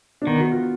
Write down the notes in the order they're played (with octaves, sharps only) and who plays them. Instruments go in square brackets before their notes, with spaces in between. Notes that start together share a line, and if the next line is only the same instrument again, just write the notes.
[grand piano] D4
[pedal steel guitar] D#3 [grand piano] B3
[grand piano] F#4
F4